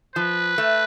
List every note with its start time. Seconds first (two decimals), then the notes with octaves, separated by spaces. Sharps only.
0.16 F3 B4
0.58 A3